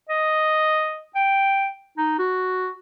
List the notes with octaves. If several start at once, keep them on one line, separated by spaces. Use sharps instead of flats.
D#5
G5
D#4
F#4